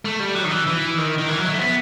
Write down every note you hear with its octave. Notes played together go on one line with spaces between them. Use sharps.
A3
G3
F#3
D#3
E3
E3
D#3
D#3
E3
F#3
A3
B3